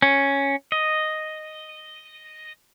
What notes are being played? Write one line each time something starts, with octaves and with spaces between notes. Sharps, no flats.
C#4
D#5